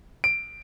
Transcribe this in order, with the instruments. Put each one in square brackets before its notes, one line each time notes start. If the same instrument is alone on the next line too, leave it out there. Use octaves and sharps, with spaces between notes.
[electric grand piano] D7